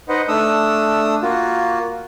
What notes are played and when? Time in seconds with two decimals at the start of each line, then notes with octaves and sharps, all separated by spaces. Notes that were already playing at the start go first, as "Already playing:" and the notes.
0.09 D#4 B4 C5 D#5 F#5
0.28 A3 D4 D#6 E6
1.22 A#3 F4 F#4